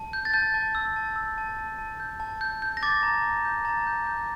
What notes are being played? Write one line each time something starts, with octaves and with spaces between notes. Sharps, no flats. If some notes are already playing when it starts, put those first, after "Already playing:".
Already playing: A5
G6
A6
A5 G6
A5
E6
A5
E6
A5
A5
A5
G6
A5
G6
G6
A#6
D6 A6
A#5
A#5
G6
A#5 A6
G6
G6